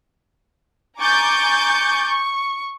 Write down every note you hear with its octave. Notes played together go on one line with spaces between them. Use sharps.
G#5 A#5 C#6 D6 G6 A6
C#6